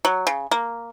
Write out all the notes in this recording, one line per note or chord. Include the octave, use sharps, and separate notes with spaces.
F#3
C#3
A#3